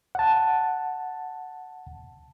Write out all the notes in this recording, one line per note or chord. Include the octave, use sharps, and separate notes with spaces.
F#5 A5